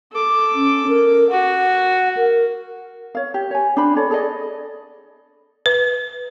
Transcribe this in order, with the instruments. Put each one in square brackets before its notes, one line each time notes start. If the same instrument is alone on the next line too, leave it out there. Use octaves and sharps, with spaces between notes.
[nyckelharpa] A4 D6
[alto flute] C#4
A#4
[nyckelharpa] F#4 [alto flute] F#5
[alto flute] A#4
[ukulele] C#5 F5
G4
C#5 G#5
D4 C5 B5
A4 C#5 D5
G#4 A4 D5 D#5
[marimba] B4